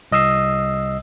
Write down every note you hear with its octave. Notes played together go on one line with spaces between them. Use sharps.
C2 D#5 D#6 E6 C7